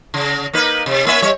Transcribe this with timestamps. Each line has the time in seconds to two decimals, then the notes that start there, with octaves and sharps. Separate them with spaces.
0.14 C#3
0.53 A#3 D#4 B4
0.86 C3
1.06 A#3 C#4 E5
1.22 G3 C#5